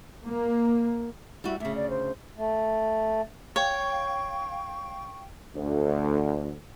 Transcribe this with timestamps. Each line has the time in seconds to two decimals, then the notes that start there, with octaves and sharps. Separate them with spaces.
0.24 A#3
1.44 G3 E4 F#4
1.60 D2 C#3 E5
1.75 D5
1.90 C5
2.37 A3
3.56 C#5 F5 G5 C#6
5.56 D2